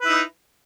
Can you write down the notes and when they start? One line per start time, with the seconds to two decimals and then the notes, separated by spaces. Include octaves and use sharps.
0.02 B4
0.05 E4
0.09 D#4